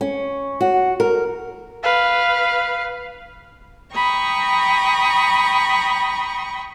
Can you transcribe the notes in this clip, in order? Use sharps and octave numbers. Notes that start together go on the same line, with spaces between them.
C#4
F#4
A#4
B4 F5
G5 A#5 B5 C#6 D#6